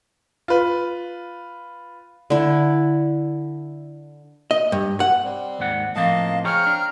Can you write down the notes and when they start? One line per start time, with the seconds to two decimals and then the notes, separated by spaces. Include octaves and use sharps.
0.48 F4 B4
2.30 D3 E4
4.51 D#5
4.72 G2
5.00 F#5
5.24 G3 C4
5.59 D#2 G#2 F#5
5.96 A2 F3 A#3 C4 D#5 F5 A5
6.45 G#4 C5 C#5 G5 A#5 F6
6.67 D4